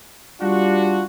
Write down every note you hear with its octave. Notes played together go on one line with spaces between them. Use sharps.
G3 D4 F4 F#4